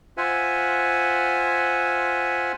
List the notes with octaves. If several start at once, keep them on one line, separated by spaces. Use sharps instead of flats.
F4 C5 E5 F#5 G#5